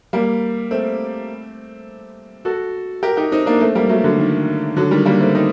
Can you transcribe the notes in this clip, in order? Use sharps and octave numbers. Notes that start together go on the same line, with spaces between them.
G3 A#3
A3 C4
F#4 A4
G4 A#4
D#4 G4
C4 D#4
A#3 D4
A3 C4
G3 A#3
F#3 A3
D3 F#3
D#3
D3 F#3
D#3 G3
G3 A#3
A3 C4
C4 D#4